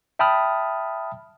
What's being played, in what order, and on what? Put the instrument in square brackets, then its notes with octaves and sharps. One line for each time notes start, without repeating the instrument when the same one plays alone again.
[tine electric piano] E5 G5 A5 B5 D#6 F6